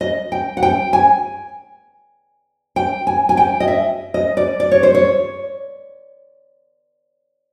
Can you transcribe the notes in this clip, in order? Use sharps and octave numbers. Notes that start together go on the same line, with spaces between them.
D#5
G5
F#5
G5
G#5
G5
G#5
G#5
G5
D#5
E5
D#5
D5
D5
C#5
C5
C#5